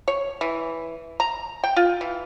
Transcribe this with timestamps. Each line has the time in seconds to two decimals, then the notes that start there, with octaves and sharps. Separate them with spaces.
0.08 C#5
0.41 E3
1.20 A#5
1.64 G5
1.76 F4
2.01 E3